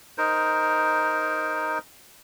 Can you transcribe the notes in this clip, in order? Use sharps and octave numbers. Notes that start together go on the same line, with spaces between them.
D#4 A#4 C5